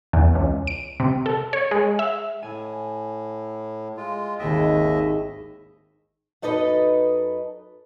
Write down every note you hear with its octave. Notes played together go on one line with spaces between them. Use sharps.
E2
C#2
D7
C3
A4
C#5
G#3
E5
A2 G#5
G#3 F4
G#1 D#2 D#5 E5 G5
F#2 D#4 A4 B4 D#5